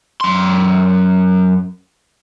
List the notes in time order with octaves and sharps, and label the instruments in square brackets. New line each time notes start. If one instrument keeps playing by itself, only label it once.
[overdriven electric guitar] F#2 C6